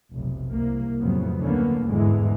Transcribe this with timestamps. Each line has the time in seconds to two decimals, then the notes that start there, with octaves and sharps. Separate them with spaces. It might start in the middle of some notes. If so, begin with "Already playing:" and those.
0.12 F1 B1
0.51 C2 A#3
0.99 C2 F2 A2 C#3 F#3 B3
1.41 D2 D3 A#3 B3 C#4
1.87 G1 E2 G#2 D3 E3 G#3